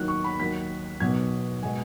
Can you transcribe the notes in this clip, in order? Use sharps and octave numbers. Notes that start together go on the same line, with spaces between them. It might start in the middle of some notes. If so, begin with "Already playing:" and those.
Already playing: D#2 D#3 F#3 F#6
C#6
B5
D#2 D#3 F#3 B6
B1 B2 F#3 G#6
B2 G#3 G#5